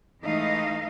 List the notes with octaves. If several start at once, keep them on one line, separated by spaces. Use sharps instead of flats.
E3 G#3 A3 D#4 D#5 F5